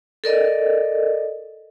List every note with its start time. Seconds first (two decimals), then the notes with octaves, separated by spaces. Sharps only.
0.24 A4 A#4 D5 D#5